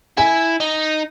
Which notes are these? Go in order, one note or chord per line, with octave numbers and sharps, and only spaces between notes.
E4 G#5
D#4